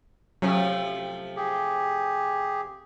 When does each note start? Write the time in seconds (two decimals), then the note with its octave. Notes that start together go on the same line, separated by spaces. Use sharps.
0.42 C3 F3 F#3 A3 C#4
1.36 G4 G#4